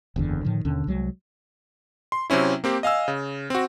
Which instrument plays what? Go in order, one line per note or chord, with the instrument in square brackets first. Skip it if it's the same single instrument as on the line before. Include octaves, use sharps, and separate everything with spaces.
[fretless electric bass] F#1 E2 D3
A2 D3 D#3 F3
D#2 B2 D3 C#4
C2 F#3 G#3
[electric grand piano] C6
C3 F#3 C4 C#4 E4
A#3 C4 G4
D#5 F5 G#5 E6
C#3
C4 F#4